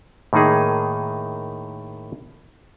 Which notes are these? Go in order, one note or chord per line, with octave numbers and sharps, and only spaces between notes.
A2 D#3 A#3 D#4 G#4